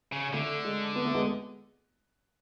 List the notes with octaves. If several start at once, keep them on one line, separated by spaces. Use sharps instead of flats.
C#3
D3 A3
G#3
B3
A3
G#3 B3